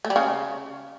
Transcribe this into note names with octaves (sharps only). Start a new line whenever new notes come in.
A3
G3
C#3